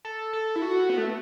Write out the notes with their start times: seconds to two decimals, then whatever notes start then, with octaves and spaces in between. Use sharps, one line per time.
0.05 A4
0.33 A4
0.56 E4
0.62 F#4
0.89 B3
0.98 A3